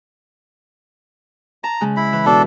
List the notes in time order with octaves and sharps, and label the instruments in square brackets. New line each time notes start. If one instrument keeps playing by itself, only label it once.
[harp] A5 [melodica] A#5
[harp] C#3 G#3
[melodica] E4 B5
[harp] E3
[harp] B2 [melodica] D4 A4